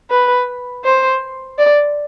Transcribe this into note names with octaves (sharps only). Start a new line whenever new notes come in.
B4
C5
D5